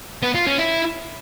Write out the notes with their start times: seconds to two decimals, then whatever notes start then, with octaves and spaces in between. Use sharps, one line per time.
0.23 B3
0.35 F4
0.47 C#4
0.59 E4